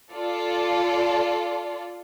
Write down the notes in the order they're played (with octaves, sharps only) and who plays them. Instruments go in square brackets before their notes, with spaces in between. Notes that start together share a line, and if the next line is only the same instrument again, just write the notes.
[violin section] F4 A4 D5